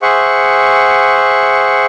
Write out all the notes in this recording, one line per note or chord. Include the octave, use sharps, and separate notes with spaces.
G#4 C5 E5 F#5 C#6